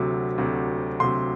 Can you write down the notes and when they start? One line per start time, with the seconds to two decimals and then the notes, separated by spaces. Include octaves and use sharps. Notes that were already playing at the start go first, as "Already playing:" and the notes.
Already playing: D2 C3 F#3
0.38 D2 C3 F#3
1.00 D2 C3 F#3 C6